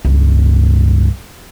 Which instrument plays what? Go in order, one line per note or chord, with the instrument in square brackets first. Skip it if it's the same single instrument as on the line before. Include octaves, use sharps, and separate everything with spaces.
[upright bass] C#2 G2